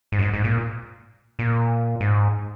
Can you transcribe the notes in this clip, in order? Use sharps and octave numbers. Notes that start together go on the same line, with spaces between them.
G#2
F#2
G#2
G#2
A#2
A#2
G#2